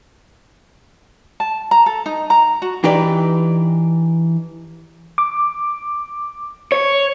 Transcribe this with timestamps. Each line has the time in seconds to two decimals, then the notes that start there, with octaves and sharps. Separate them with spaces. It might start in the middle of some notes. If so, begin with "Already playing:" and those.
1.40 A5
1.71 A#5
1.86 A4
2.06 D#4
2.30 A#5
2.62 F#4
2.84 E3 D4 D#4 G4 B4 D5
5.18 D6
6.72 C#5